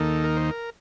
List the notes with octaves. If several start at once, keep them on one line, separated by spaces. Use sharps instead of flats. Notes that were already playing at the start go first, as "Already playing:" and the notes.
Already playing: D#2 D#3 A#3 D#4 A4
A#4
C5
A#4